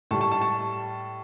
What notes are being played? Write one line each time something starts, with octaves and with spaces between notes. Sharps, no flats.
A2 G3 A5 C#6
A5 C#6
A5 C#6
A5 C#6